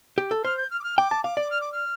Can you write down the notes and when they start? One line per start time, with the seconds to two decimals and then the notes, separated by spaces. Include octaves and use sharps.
0.18 G4
0.31 A4
0.44 C5 F6
0.57 G6
0.71 F6
0.80 D6
0.84 F6
0.98 G5 D6
1.11 A5
1.24 F5 D6
1.37 D5
1.51 F6
1.61 D6
1.72 F6